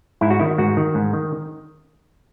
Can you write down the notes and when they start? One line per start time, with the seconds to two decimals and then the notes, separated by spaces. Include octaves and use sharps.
0.21 G#2 E4
0.30 F#4
0.39 D#3 E4
0.58 G#2 F#4
0.77 D#3
0.95 G#2
1.13 D#3